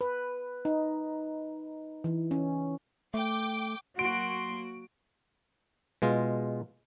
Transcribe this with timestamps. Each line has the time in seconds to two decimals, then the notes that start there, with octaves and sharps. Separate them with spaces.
0.01 B4
0.65 D#4
2.04 E3
2.31 C#4
3.14 A3 G5 D6
3.99 F#3 A#3 F#4 C6 D7
6.02 B2 G#3 F4